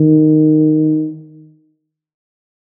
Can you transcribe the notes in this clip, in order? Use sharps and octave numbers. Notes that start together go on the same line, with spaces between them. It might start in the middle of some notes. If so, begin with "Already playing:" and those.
Already playing: D#3